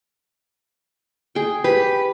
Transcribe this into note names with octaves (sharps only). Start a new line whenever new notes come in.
G#4 G5
G4 B4